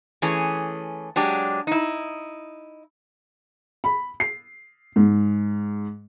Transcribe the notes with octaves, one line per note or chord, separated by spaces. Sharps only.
E3 A3 C#4 G#4
F#3 G#3 D4 G4
D#4 E4
B5
C7
G#2